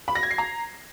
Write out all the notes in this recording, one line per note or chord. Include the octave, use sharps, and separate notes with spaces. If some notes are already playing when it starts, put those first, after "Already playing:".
B5
A#6
G#6
C7
A#5